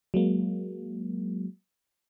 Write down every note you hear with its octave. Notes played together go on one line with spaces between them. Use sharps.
F#3 G#3 A#3